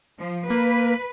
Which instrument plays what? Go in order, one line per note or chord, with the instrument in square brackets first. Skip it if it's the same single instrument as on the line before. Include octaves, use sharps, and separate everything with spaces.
[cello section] F3
[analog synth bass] A#3 [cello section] B4